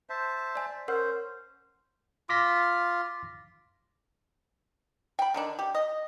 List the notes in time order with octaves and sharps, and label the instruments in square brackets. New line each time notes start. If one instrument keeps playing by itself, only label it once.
[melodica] C5 E5 A5
[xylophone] D5 G#5
[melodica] C#4 C5 [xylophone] A#4 F#5
[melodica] F4 [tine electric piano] D6 A#6 B6
[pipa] G5 B5
D3 D#3 D4
G4
D#5